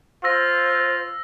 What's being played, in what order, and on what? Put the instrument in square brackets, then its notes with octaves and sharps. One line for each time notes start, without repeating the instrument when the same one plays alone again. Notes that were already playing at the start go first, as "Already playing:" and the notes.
[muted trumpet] F4 [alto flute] C5 [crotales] E6 A#6